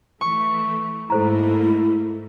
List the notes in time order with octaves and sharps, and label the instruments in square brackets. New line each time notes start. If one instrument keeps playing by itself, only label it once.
[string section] E3 A3 [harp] C#6
[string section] G#2 A3 A#3 [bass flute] E4 [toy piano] A4 C5 A#5